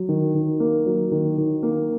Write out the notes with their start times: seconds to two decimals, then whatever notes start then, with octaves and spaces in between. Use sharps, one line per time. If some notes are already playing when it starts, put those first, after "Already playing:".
Already playing: F#3
0.09 D#3
0.35 D#3
0.60 A#3
0.86 F#3
1.12 D#3
1.38 D#3
1.63 A#3